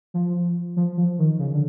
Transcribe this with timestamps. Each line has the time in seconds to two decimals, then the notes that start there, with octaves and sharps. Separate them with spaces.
0.14 F3
0.76 F3
0.97 F3
1.19 D#3
1.39 C#3
1.53 D3